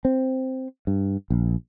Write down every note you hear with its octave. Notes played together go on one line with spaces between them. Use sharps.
C4
G2
A#1